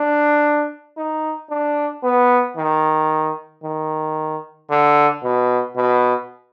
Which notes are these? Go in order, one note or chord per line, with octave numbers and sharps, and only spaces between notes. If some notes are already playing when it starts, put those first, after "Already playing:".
Already playing: D4
D#4
D4
B3
D#3
D#3
D3
B2
B2